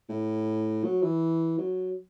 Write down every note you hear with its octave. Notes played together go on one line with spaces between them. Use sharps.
A2
F#3
E3
F#3